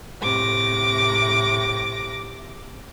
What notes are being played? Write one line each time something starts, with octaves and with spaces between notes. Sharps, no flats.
A2 C3 D6 A#6